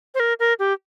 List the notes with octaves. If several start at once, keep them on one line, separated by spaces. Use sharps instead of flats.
C5
A#4
A#4
G4